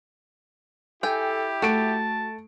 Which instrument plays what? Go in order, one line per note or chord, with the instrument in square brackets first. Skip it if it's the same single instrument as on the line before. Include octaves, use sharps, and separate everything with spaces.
[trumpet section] E4 G4 [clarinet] A4 [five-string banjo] G5 G#5
[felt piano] A3 D7 [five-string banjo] F#4 [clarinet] A5